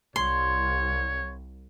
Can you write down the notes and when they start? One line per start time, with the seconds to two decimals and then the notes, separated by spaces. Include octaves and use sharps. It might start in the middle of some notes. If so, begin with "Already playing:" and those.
0.16 C2 C#5 C6